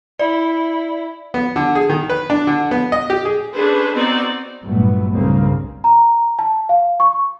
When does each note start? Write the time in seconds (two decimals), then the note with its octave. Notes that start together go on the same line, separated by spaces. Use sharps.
0.19 E4 D5
1.34 B3
1.56 D3
1.75 G#4
1.89 D#3
2.10 B4
2.30 D4
2.47 D3
2.71 B3
2.92 D#5
3.10 G4
3.25 G#4
3.54 C#4 D4 G#4 A4 B4 C5
3.93 B3 C4 D#4 F#4 C5 D5
4.63 G1 G2 A#2 F#3 A3 B3
5.13 G1 C2 G2 C#3 A#3 C4
5.84 A#5
6.39 A5
6.69 F5
7.00 C#6